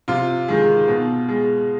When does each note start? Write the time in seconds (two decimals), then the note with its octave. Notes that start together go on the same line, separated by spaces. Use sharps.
0.08 C3 F4
0.48 D#3 G#3
0.88 B2
1.29 G#3